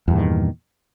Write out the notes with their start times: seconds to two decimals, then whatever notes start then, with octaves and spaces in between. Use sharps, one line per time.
0.08 E2
0.10 G2
0.13 A#2
0.15 D#3